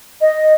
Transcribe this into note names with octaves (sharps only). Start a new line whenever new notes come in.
D#5